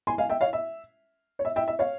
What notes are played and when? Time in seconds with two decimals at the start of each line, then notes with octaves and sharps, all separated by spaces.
0.07 G#5 C6
0.18 F5 G#5
0.29 E5 G5
0.41 C#5 F5
0.53 E5
1.39 C#5
1.45 E5
1.56 E5 G5
1.68 E5
1.79 C#5 F5